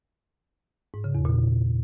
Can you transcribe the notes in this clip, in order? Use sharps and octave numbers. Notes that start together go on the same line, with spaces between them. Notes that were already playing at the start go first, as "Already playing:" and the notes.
G#2
C#3
E2
A#2